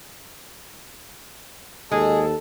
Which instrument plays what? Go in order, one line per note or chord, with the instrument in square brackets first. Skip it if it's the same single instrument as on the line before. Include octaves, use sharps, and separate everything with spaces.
[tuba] D#2 [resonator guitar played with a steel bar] G#3 [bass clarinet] G#4 [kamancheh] A4